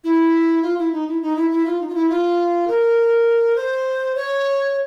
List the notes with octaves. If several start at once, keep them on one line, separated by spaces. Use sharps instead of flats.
E4
F4
E4
D#4
E4
D#4
E4
E4
F4
D#4
F4
E4
F4
A#4
C5
C#5